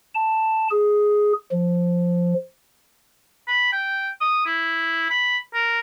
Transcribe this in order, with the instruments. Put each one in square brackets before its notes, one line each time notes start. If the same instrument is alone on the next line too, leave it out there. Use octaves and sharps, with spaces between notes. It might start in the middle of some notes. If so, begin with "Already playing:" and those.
[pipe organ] A5
G#4
F3
[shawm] B5
G5
D#6
E4
B5
A#4